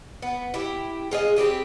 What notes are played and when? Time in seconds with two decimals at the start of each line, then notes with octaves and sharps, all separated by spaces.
0.22 B3
0.54 E4 G4
1.11 G#3 F4 G#4 D#5
1.36 C4 E4 G4 G#4